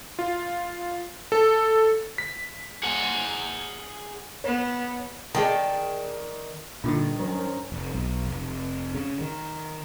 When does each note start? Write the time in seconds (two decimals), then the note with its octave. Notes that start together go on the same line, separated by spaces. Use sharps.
0.19 F4
1.32 A4
2.18 B6
2.83 G#4 F#5
4.44 B3 C#5
5.35 D#3 G#4 D5 G5 A5
6.84 G2 A#2 D3 D#3 D4 D#4 F4
7.20 F#3 C#4 A#4 C5
7.72 F1
7.93 B1
8.26 F1
8.95 C#3
9.21 D#3